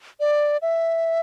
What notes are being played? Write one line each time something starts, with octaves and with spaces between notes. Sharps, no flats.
D5
E5